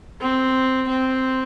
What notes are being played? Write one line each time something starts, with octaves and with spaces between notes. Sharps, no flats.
C4
C4